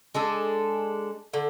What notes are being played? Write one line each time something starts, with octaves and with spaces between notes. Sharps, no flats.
G#3 D4 A4
D3